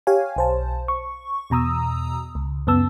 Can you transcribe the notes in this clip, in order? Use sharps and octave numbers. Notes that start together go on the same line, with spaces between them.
G4 C#5 F5 G#5
B1 C5 A5
C#6
E2 B2 A#5 D#6 E6
C#2
F#2 C#3 B3 A5 E6